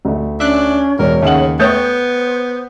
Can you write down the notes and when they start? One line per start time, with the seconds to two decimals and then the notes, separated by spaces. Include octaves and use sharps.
0.05 D2 A3
0.40 C#4 D4 E5 F#6
0.99 E1 A#4 C#5
1.23 D#2 C#3 A3 C#4 F#5 F#7
1.59 A3 B3 C5 C#5 G5 D#6 G6 A6